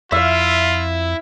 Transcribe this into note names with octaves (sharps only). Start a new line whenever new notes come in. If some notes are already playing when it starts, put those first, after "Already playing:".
F2 E4 F4 E5 F5